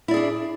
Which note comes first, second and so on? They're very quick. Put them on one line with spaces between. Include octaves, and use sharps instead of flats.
E4 D5 G#4 D4